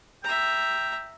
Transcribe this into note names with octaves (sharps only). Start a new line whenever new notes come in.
E5 G5 A#5